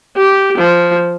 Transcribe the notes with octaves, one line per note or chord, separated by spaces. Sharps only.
G4
F3